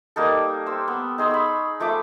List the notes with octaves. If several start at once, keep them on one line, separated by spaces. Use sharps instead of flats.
G3 A#3 D#4 A4
G4 C5 E6
B3
D#4 G#4 C6 E6
B5 C#6
F3 A3 E5 D6